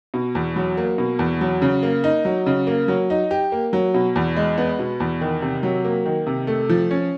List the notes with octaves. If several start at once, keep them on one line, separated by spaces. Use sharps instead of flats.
B2
E2
F#3
A#3
B2
E2
F#3
C#3
A#3
D#4
F#3
C#3
A#3
F#3
D#4
G4
A#3
F#3
B2
E2
G#3
B3
B2
E2
D#3
C3
F#3
A#3
D#3
C3
A3
F3
C#4